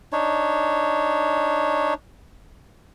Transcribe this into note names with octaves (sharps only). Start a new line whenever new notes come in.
D4 D#4 C#5